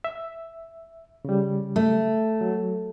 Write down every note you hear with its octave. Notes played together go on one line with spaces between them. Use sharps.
E5
C#3 G3
A3
F#3